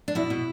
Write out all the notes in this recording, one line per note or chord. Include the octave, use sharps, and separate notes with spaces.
D4
B2 E4
B2